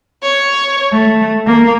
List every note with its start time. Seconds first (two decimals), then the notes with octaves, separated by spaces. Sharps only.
0.22 C#5
0.93 A3
1.47 A#3